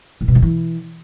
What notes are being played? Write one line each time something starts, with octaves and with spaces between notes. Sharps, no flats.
A#2
B2
D#3
E3